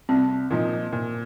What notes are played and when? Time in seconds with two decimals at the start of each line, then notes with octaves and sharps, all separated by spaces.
0.09 C2 C4
0.50 A#2 F3 D#4
0.92 A#2